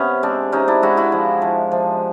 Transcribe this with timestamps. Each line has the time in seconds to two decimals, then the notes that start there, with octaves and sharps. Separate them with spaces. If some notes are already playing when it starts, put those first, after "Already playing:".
Already playing: C3 B3 C#4
0.23 G#3 C4 D4
0.52 C3 C#4 D#4
0.68 D4 E4
0.83 G#3 E4 F#4
0.97 E4 F#4
1.12 F3
1.42 F3
1.72 F3